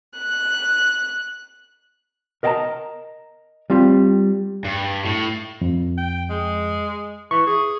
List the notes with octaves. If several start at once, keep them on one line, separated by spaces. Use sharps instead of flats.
F#6
A#4 D#5 F5 G5 A5 A#5
G3 C4 F4 G4
G2
A2
F2
G5
G#3
E3 C#6
G#4